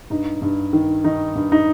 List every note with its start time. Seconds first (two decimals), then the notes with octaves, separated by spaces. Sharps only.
0.10 G2 D#4
0.42 G2
0.73 D#3
1.04 D#3 D#4
1.35 G2
1.52 D#4